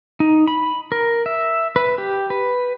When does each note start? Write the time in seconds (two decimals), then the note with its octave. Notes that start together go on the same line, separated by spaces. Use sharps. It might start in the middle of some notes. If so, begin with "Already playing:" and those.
0.20 D#4
0.48 B5
0.92 A#4
1.26 E5
1.76 B4
1.98 G4
2.30 B4